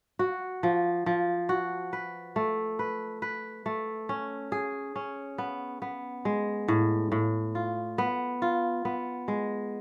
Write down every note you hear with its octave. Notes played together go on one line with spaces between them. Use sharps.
F#4
F3
F3
F#4
B4
A3
B4
B4
A3
C#4
G#4
C#4
B3
B3
G#3
A2
A2
F4
B3
F4
B3
G#3